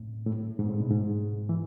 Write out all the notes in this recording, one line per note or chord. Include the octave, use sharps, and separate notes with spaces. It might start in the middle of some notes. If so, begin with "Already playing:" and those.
Already playing: A2
A2
G#2
A2
B2
G#2
E3